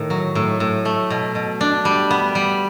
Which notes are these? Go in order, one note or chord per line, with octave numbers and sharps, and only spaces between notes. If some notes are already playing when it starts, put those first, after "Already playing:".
Already playing: A2 D#3
F#3
A2
A2
A3
B2
B2
D4
G3
B3
G3